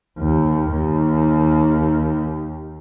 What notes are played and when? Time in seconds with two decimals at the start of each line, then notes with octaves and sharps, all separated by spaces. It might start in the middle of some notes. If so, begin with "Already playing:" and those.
0.19 D#2
0.73 D#2